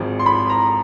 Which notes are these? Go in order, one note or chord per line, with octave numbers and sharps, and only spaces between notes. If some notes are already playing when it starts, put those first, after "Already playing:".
Already playing: G#1 G#2 F3
C6
B5
A#5